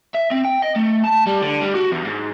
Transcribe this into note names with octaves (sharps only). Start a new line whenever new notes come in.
E5
C4
G5
D#5
A3
A5
G3
D3
G3
F#4
E2
G#2